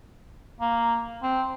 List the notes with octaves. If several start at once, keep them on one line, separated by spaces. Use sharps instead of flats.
A#3
C4